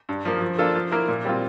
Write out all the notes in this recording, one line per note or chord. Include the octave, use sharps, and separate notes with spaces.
G2
F3 A#3
F3
A#3 D4 F4 A4
F3
A#3 E4 A#4
A#2
G3 C4 F4